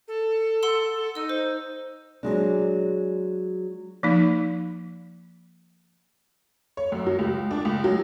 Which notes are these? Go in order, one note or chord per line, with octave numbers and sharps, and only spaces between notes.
A4
F#5 C6 E6
A4
D#4 D#5 E6
C5
F#3 G#3 D4
F3 A#3 D#4
C#5
F#2
F#3
C#2
D4
C#2
F#3